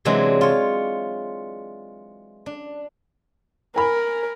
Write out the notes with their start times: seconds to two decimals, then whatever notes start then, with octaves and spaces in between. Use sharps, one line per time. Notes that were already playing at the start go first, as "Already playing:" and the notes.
0.05 C3 E3 F#3 G#3 D4
0.41 F4 C#5
2.46 D4
3.76 A#4 G#5 B5